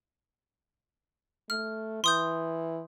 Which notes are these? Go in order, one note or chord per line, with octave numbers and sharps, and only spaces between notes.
A3 F6
E3 C6 D#6 G6